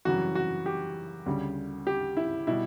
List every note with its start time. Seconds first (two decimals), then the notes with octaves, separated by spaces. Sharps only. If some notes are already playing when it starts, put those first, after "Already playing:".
0.05 F#2 C#3 E3 G3 F#4
0.35 F#4
0.66 G4
1.26 D2 C#3 G3
1.87 G4
2.17 E4
2.47 B2 G3 E4